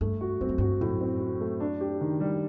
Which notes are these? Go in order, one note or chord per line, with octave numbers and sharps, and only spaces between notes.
G2 A3
F#4
G2 C4
F#2
G2 F#4
F#2 A2
C4
F#4
A3
D4
G4
D#3
G3